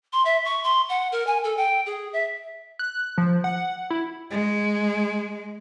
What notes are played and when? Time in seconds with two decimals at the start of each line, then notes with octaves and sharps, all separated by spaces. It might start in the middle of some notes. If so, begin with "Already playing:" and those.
0.13 C6
0.25 E5
0.45 C#6
0.63 C6
0.89 F#5
1.12 A#4
1.27 G#5
1.44 A4
1.57 G5
1.86 G#4
2.13 E5
2.79 F#6
3.18 F3
3.44 F#5
3.90 E4
4.31 G#3